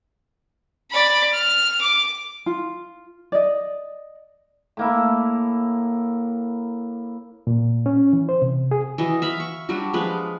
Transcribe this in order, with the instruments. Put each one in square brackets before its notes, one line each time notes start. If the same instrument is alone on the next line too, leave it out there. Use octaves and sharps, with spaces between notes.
[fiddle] D5 B5
F6
D6
[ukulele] F4
D5 D#5
[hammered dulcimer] A2 A#3 E4
[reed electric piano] A#2
C#4
E3
C5
C3
G#4
[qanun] E3 F#3 D#5
E5 F5 B5
C#6
F#3 G3 D4 F#4
F3 G#3 B4 F5